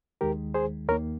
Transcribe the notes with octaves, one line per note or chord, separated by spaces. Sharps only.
D#2 D#3 G#3 G4 A#4
G#4 C5
D#2 D#3 A#3 A#4 C#5